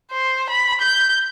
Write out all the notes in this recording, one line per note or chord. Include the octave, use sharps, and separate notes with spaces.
C5
B5
G6